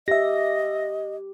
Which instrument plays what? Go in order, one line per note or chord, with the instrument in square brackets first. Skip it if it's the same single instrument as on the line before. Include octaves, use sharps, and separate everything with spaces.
[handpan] G4 [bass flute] D#5 [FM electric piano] E5 A#6